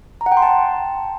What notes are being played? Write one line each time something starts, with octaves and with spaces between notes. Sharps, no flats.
A#5
F#5
G5
C6
A5